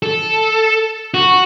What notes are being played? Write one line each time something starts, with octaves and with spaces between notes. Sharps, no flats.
A4
F#4